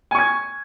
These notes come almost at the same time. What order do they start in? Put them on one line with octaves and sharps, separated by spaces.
G#5 C#6 G#6